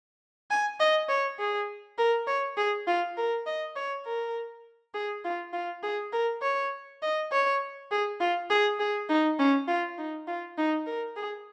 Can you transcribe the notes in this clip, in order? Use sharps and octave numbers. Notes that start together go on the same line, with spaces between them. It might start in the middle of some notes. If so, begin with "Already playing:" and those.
G#5
D#5
C#5
G#4
A#4
C#5
G#4
F4
A#4
D#5
C#5
A#4
G#4
F4
F4
G#4
A#4
C#5
D#5
C#5
G#4
F4
G#4
G#4
D#4
C#4
F4
D#4
F4
D#4
A#4
G#4